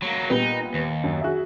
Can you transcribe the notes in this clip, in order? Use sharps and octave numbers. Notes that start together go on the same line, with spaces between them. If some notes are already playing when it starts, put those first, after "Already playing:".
F#3 A#3
A#2 G3 B3 D#4
D#2
F#2
F#4 G#4 E5